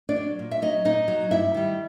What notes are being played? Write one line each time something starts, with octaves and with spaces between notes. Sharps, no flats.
D4 D5
F#3
A#2
E5
F#3 D#4 D#5
A#2 D#4 D#5
F#3
G2 E4 E5
D#3 G3